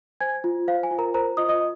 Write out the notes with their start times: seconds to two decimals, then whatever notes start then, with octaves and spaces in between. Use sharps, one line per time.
0.20 C5 G#5 G#6
0.44 F4
0.68 C5 F5
0.83 G#5
0.91 F4
0.98 A#4 A#5
1.14 A#4 C5 A#5
1.37 F4 D#5 D#6
1.49 D#5 D#6